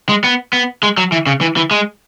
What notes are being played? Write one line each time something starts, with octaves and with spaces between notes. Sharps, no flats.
G#3
B3
B3
G#3
F#3
E3
C#3
E3
E3
G#3